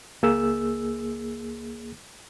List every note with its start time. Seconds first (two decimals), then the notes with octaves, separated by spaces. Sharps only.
0.23 C#2 A#3 G#4 E6